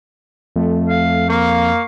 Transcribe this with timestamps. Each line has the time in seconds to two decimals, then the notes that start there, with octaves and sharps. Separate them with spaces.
0.56 F2 A3
0.89 F5
1.29 A#3 F5 C#6